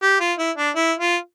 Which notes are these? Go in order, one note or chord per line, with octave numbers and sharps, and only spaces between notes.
G4
F4
E4
D4
E4
F4